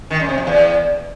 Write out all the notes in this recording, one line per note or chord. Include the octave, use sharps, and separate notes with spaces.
D#3
F#2
C3
F2
E2